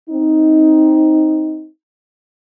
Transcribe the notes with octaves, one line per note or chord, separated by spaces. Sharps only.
C4 D#4